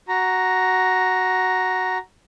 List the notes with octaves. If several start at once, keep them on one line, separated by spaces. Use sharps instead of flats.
F#4 A#5